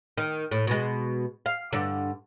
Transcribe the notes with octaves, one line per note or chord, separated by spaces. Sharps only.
D#3
A2
B2 G#3
F5
G2 D3